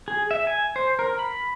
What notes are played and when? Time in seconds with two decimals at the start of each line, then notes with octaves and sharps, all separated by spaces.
0.08 G#4
0.31 E5
0.47 G#5
0.76 C5
0.99 A#4
1.19 B5